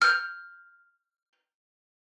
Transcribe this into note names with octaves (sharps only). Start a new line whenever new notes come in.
F6 G6